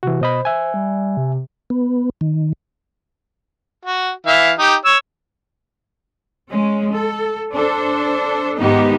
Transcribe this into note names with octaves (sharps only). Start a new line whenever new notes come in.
C3 E3 F#4
B2 C5 D#5 B5
E5 G#5
G3
C3
B3
D#3
F#4
E3 E5 F5
D#4 G4
C#5 E6
G#3 C#4
A4
D4 A4 C5
G#2 D#3 G#3 B3 D#4 G4